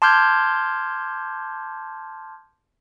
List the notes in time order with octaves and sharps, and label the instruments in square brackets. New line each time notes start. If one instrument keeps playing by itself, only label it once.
[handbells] A5 C6 D6 F6 G6 G#6